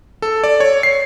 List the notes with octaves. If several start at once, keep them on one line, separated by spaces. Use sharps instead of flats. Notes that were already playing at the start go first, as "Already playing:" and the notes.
A4
D5
C#5
C7